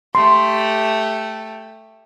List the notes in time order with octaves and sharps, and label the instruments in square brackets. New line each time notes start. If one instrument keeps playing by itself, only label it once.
[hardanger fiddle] A3 G4 [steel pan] C6